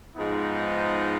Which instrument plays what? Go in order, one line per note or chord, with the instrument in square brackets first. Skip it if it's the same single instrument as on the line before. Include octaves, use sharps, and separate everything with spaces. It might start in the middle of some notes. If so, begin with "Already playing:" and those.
[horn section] G#2 F3 G#3 B3 D#4